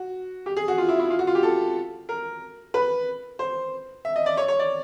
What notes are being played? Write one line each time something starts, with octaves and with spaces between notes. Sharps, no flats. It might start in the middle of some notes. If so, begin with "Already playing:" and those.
Already playing: F#4
G4
G#4
F#4
F4
E4
E4
F4
F#4
F4
G4
A4
A#4
B4
C5
E5
D#5
D5
C#5
C#5
D5